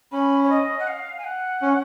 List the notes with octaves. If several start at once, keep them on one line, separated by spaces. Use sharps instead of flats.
C#4 B5
C#5
D#5
F#5
F5
G#5
F#5
C#4